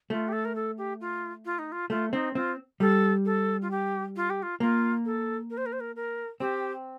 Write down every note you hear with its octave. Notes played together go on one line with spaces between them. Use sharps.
A3 F4
G4
A4
A#4
A4
G4
F4
F4
D#4
F4
A3 F4
C4 D#4
C4 F4
G3 A4
A4
F4
G4
F4
G4
F4
A#3 F4
A4
A#4
C5
A#4
C5
A#4
A#4
C4 G4